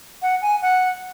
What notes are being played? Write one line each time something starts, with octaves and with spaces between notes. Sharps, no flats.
F#5
G#5
F#5